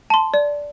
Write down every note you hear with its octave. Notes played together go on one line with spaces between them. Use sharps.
A5 C6
D5